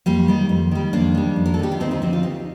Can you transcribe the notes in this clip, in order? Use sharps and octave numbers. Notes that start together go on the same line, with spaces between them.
F2 G3 A#3
D#3 G3
F2
D#3 G3
F2 A#3 D4
D#3 G3
F2
A#4
A4
D#3 G3 G4
F4
D2 C4 D#4
C4 D#4
D3 F3 C4 D#4
D4 F4
D2 D#4 G4